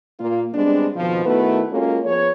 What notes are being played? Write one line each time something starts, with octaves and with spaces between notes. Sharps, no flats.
A#2 A#3 F4
G3 G#3 B3 C4 D4
F2 B2 D#3 F3
D#3 A3 B3 E4 F#4 B4
G#3 A#3 C#4 F4 F#4 A4
F3 B3 G#4 C#5